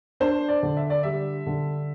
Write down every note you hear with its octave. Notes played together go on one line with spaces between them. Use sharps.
D4 C5
D5
D3
E5
D5
G3 E5
D3